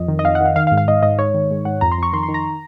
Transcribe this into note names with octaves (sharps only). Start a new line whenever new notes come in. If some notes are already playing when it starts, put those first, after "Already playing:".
Already playing: F2 D#5
D#3
D#5
F2 F5
F#5
D#3 F5
D#3 F5
F5
G#2
F5
G#2 D#5
G#2 D#5
G#2 C#5
D#3
G#2
G#2 F#5
F2 A#5
C6
F2 C#6
D#3 C6
C6
D#3
A#5